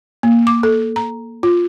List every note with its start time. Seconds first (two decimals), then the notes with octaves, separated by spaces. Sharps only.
0.23 A#3
0.47 D6
0.63 A4
0.96 A#5
1.43 F4